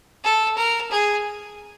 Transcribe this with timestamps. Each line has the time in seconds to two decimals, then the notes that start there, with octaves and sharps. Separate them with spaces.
0.24 A4
0.57 A#4
0.91 G#4